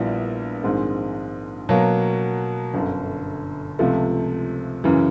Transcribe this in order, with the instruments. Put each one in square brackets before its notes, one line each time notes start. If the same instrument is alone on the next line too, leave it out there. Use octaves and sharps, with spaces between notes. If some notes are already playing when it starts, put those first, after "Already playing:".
Already playing: [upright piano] A#1 A#2 G3 B3 E4
A#1 G#2 D#3 G#3 C4
B2 F#3 A#3
G1 F#2 D3
C#2 C3 F3 A3
F#2 C#3 E3